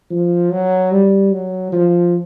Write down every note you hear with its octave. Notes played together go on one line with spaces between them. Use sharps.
F3
F#3
G3
F#3
F3